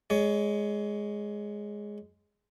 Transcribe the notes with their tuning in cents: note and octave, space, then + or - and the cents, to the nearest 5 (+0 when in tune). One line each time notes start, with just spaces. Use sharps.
G#3 +0 C#5 +25